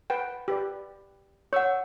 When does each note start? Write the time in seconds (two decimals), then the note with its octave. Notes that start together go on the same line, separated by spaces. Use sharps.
0.10 B4 F#5 G5
0.48 G4 B4 D5
1.53 C#5 F#5 C#6 E6